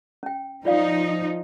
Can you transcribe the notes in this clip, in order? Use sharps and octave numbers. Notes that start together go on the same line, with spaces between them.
C#4 G5
F3 D#4 F4 D5 F5